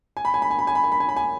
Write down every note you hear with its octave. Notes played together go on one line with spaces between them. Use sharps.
G#5
B5
G#5
B5
G#5
B5
G#5
B5
G#5
B5
G#5
B5
G#5